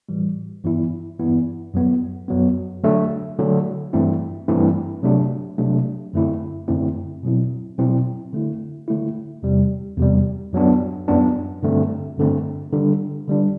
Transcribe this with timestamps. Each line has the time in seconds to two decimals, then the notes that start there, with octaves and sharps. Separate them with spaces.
0.09 A2 E3 G3
0.64 G2 E3 B3 E4
1.19 G2 E3 B3 E4
1.74 F#2 F#3 B3
2.28 F#2 F#3 B3
2.84 D3 F#3 A3 D4
3.39 D3 F#3 A3 D4
3.93 G2 E3 A3 C4 E4
4.48 G2 E3 A3 C4 E4
5.03 C3 F#3 A3 D4
5.58 C3 F#3 A3 D4
6.13 F#2 D3 A3 C4 E4
6.68 F#2 D3 A3 C4 E4
7.23 B2 F#3 C4 E4
7.78 B2 F#3 C4 E4
8.33 D3 A3 E4
8.88 D3 A3 E4
9.43 E2 C3 G3
9.98 E2 C3 G3
10.53 F#2 F#3 B3 D4
11.08 F#2 F#3 B3 D4
11.63 G2 D3 A3 C4
12.18 G2 D3 A3 C4
12.73 D3 G3 D4
13.28 D3 G3 D4